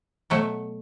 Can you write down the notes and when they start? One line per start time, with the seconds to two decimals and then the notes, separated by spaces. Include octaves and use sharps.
0.30 B2 F#3 A3